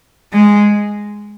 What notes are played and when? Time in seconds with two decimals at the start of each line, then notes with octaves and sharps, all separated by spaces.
0.33 G#3